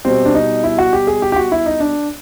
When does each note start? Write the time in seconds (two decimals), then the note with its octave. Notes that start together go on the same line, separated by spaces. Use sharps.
0.05 B2 G3 C4
0.25 D4
0.34 D#4
0.64 E4
0.78 F#4
0.93 G4
1.07 G#4
1.22 G4
1.32 G4
1.36 F#4
1.52 E4
1.66 D#4
1.80 D4